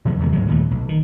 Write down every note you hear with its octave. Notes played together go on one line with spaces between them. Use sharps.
B2 E3 F#3 B3
E2 C3 D#3 G#3
D2 G#2 F#3 G#3
D#2 A#2 A3
B1
D#3